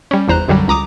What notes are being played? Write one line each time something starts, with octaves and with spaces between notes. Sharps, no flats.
G3 C#4
G1 E2 C5 A#5 F#6
B1 F#2 D3 F#3 G3
C#2 A#5 D6 D#6